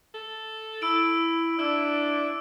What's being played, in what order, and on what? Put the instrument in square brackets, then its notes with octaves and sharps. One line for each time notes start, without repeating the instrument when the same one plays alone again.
[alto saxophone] A4
[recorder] E4 [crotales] E6 D7 F#7
[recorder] D4 [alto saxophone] E4 [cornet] D5 [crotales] E6